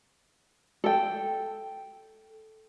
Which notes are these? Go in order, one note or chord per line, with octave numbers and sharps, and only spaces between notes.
A4 G5